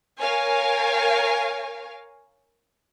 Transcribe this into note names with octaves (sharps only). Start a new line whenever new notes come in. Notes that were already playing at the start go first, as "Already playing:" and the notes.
A#4 C#5 F5 G#5